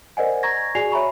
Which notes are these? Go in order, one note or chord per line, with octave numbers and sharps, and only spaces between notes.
A#4 C5 D5 D#5 F#5 G#5
A#5 C#6 G#6 A#6
F#4 G#4 D5 G#5 C7 F7
C#5 E5 G#5 A#5 B5 C#6